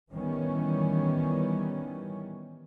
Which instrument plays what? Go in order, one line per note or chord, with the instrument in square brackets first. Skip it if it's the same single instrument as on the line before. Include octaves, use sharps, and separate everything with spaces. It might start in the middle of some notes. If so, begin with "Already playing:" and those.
[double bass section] D#3 E3 G3 B3 C#4